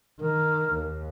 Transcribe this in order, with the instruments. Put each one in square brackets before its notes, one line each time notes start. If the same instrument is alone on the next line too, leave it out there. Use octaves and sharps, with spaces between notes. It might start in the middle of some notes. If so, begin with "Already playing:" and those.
[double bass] D#3 [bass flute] A#4
[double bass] D#2